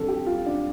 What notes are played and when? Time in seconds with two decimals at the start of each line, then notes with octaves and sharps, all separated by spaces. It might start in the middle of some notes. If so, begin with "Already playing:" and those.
Already playing: F2 D3 G3 A4
0.08 G4
0.26 F4
0.46 D4